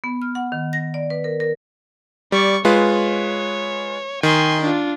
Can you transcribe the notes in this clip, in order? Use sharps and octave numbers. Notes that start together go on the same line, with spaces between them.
B3
F6
F#5
D#3
A#6
D5
B4
A#4
A#4
G3 D5 C#6
G#3 F4 B4 C#5
D#3 G#5 C6
D4 F4